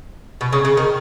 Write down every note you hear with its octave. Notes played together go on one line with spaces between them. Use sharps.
B2
C#3
C#3
D#3